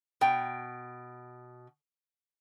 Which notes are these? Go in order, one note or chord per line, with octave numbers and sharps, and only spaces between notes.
B2 G5